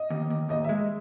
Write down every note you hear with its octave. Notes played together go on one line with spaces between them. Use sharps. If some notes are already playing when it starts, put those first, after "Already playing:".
Already playing: D#5
D#2
D#2
D#2 D#5
G#3 E5